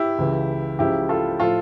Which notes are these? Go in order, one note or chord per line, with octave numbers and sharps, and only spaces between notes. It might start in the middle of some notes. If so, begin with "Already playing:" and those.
Already playing: E4 G4
C#2 C#3 E3
C#2 C#3 F3 E4 G4
F4 A4
A2 F3 F4 A4